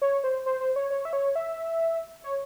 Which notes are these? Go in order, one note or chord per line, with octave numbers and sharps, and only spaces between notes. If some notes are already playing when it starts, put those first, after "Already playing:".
C#5
C5
C5
C5
C#5
C#5
E5
C#5
E5
C#5